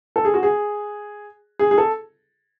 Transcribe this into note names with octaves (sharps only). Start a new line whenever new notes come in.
A4
G#4
F#4
G#4
G#4
G#4
A4